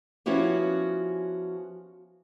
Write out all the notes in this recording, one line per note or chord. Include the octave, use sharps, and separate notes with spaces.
F3 B3 C#4 E4 F#4 G4